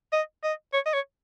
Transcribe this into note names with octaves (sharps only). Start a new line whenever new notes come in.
D#5
D#5
C#5
D#5
C#5